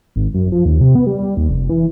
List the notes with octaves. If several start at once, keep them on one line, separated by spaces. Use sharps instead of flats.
G#1
F#2
F3
D#2
C3
B3
G3
G3
D#2
F1
E3